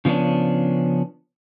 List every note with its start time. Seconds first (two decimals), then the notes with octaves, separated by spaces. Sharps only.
0.05 C#3 F3 B3 C#4 D4